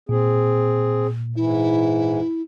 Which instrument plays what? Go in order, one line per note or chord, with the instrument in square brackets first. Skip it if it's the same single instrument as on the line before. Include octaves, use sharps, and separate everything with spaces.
[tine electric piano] A#2 [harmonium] C4 G#4
[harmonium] G#2 E3 [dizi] E4